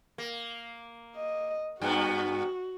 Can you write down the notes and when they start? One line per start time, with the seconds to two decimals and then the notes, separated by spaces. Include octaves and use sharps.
0.18 A#3
1.16 D#5
1.82 G2 B3 F#4